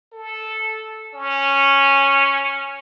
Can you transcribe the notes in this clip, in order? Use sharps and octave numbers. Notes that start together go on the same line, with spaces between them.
A4
C#4